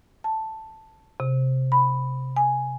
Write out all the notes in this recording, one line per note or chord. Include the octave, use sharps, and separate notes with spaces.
A5
C3
B5
G#5